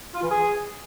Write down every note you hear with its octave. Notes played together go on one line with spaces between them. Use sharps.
F4
E3
G#4